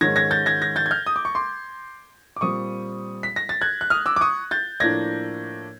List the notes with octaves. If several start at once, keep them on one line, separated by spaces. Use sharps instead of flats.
G#2 D#3 G#3 C#4 G#6 A#6
G#6 A#6
G6 A6
G#6 A#6
G#6 A#6
G6 A6
G#6
F6 G6
D#6
D6
C#6
C6 D6
D6
A#2 G3 C4 C#6 D#6
B6
A#6
A6
F#6 G#6
F#6
D#6 F6
D6 E6
D6
C#6 D#6
G6 A6
A2 F3 A#3 D4 G#6 A#6